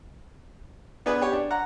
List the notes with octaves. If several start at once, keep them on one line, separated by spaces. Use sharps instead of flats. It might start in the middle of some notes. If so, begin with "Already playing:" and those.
B3 D4 G#4 B4
G4 C#5
D4
F#5 A#5